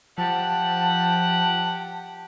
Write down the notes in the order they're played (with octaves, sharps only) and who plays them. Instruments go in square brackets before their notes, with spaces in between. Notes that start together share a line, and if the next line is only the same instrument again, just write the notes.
[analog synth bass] F3 [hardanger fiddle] G4 F#5 [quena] A5